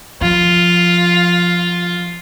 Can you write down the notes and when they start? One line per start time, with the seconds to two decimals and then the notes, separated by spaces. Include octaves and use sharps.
0.21 F3 F4